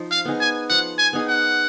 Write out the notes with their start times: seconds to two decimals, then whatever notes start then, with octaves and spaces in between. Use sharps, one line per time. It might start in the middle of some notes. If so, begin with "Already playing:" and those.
Already playing: F3 D#4
0.11 F5
0.25 B3 D#4 G#4
0.40 G#5
0.70 F3 F#5
0.98 G#5
1.13 B3 D#4 G#4
1.28 F#5